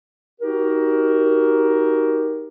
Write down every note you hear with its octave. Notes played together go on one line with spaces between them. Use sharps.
D#4 F#4 G4 A#4